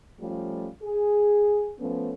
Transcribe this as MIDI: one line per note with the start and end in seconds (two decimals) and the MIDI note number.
0.20 0.68 53
0.20 0.68 55
0.20 0.68 57
0.20 0.68 61
0.20 0.68 65
0.83 1.72 68
1.79 2.13 53
1.79 2.13 57
1.79 2.13 59
1.79 2.13 61